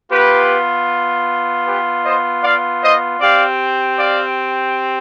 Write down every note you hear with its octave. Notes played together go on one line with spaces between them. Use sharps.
B3 F4 G4 B4
G4 B4
C5 D#5
D5 F5
C5 D#5
C4 G4 D5 F5
D5 F5